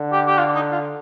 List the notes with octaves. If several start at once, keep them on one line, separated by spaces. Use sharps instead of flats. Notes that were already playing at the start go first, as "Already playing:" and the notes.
Already playing: D3
G4
G4
F4
D#4
F4